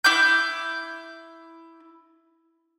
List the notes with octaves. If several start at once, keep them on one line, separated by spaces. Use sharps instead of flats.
E4 D6 G6